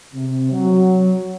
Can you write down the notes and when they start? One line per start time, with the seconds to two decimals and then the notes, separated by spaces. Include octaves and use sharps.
0.14 C3
0.52 F#3